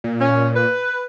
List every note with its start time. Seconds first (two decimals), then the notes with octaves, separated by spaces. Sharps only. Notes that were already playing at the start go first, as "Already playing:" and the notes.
0.04 A#2
0.21 C#4
0.56 B4